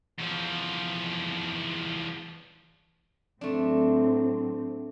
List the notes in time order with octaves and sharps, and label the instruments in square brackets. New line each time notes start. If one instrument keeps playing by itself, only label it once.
[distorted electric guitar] E2 F3
[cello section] A2 F#3 C4 [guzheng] A3 D4